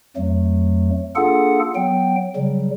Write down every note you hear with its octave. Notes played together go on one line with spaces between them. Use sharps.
F2 F#3 A3
A#3 D4 F4 G#4 A4 F#5
F#3 B3 G5
C#3 F#3 G3